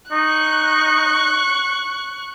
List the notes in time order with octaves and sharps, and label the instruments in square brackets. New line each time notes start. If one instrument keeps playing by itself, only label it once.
[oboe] D#4 [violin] C#6 F#6